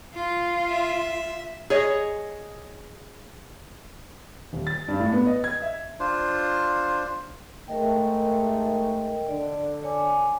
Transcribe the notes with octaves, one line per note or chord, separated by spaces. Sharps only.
F4
E5
G#4 C#5 D#5
D#1
A6
G2
A2
B3
D#5
G#6
E5
D4 F4 C5
G#2 A3 A#4 D#5 G5
D3 D5
C#5 G#5 D6